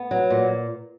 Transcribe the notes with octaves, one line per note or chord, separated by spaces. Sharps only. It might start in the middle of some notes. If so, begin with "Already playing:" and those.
Already playing: B3
F#3
A#2